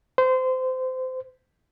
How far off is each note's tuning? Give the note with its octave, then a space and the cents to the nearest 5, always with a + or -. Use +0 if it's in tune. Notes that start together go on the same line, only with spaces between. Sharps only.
C5 -25